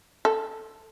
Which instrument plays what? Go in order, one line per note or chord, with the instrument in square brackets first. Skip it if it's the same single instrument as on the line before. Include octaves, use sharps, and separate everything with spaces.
[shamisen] A4